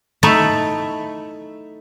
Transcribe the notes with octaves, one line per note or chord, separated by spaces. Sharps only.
A3 D#4 E4 E5